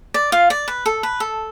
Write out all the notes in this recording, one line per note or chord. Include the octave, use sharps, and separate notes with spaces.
D5
F4 F5
D5
B4
A4
B4
A4